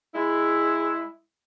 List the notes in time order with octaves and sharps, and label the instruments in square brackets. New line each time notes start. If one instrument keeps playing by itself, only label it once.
[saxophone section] G#3 E4